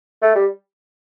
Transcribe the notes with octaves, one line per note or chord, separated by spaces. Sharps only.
A3
G3